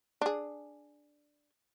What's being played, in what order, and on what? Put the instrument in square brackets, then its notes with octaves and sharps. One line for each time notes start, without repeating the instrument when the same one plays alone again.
[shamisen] D4 G#4